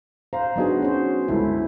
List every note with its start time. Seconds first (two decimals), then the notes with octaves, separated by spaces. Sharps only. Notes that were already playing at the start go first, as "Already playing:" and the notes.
0.33 C5 F5 A#5
0.56 F#3 B3 D4 D#4 F#4 G#4
0.82 C#4 C5
1.28 G1 C#2 E4 A4